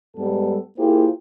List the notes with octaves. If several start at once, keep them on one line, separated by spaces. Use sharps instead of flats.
G#2 G3 B3 A4
A#3 E4 F4 G4 G#4 C5